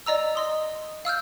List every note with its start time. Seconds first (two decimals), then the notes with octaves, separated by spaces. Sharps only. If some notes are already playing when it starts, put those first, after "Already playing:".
0.06 D5 D#5 A#5 E6
0.35 D#5 C6 D#6
1.05 F5 E6 F6 G6